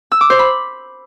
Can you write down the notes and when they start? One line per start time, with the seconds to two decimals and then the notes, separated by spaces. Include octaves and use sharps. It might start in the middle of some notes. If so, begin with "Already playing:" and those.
0.12 E6
0.21 D6
0.30 C5
0.39 B5